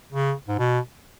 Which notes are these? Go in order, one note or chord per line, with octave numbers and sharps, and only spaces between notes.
C#3
G#2
B2